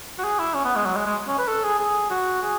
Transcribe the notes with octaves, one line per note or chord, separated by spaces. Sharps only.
F#4
G#4
E4
C#4
B3
G#3
F#3
G#3
G#3
C#4
B4
A4
G#4
G#4
F#4
G#4